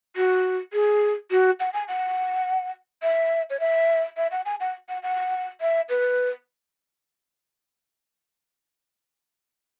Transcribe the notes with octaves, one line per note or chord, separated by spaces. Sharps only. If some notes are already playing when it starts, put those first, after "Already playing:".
F#4
G#4
F#4
F#5
G#5
F#5
E5
C#5
E5
E5
F#5
G#5
F#5
F#5
F#5
E5
B4